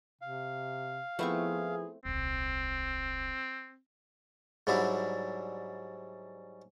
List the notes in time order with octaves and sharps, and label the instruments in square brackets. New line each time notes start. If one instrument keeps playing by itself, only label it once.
[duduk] C3 [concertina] F5
[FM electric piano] F3 B3 E4 [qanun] A3 C4 C#6 [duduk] G#4
[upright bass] D#1 C2 [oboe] C4
[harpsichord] G#2 F#3 G3 D4 E4